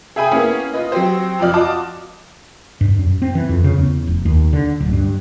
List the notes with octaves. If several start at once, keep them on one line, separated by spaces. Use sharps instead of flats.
G#4 E5 G5 G#5 B5 D#6
A#3 B3 C#4 E4 G#4
F4 B4 D#5
F#3 C4 G4 C5
F2 F3 D5 F6
F4 F#4 D#5 A5 D6
G2
F#2
C4
E3
F2
C#3
E2
F1
D#2
D3
D1
G2